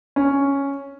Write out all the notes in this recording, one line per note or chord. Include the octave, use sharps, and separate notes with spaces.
C#4